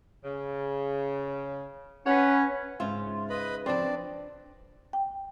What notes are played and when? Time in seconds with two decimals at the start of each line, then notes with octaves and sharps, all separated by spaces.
0.25 C#3
2.06 C#4 B4 C#5 F#5
2.80 G#2 C#3 F4 E5
3.30 B4 D#5 B5
3.66 C#3 F3 C4 D4 B4 D5
4.93 G5